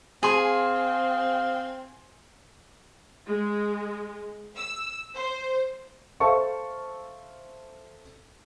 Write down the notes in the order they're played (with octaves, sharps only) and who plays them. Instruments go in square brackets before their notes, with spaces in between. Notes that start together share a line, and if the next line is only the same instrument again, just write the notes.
[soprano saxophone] C4 [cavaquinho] G#4 [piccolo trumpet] F5 [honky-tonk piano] G#5 C6
[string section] G#3
E6
C5
[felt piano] A4 C5 E5 F5 A5 C#6